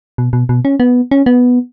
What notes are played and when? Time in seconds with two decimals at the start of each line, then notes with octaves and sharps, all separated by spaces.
0.18 B2
0.33 B2
0.49 B2
0.65 C#4
0.80 B3
1.11 C#4
1.26 B3